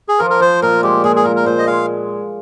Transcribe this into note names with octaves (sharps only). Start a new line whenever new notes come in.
G#4
F3 A#4
A#4
F3 C5
A#2 A#4
G#3 G4
A#2 G#4
G#4
A#2 A#4
A#4
A#2 C5
D#5
G#3 F5